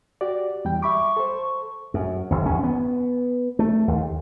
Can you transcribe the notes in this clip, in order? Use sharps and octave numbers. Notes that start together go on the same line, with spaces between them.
F#4 G4 D5
E2 G3 G5
E5 B5 C#6 D6
A4 C5
F#2
F#1 D#2
E2 C#4
B3
A3
D#2